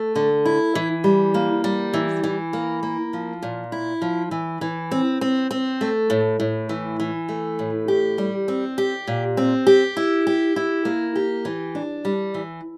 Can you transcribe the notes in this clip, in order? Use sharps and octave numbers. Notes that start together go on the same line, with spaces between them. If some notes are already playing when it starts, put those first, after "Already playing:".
Already playing: A3
D3
E4
E3
G3
A#3
G3
E3
E3
A#3
A#3
F3
A#2
E4
F3
E3
E3
C4
C4
C4
A3
A2
A2
E3
E3
A3
A2
G4
G3
C4
G4
A#2
C4
G4
E4
G4
E4
A#3
G4
E3
D4
G3
E3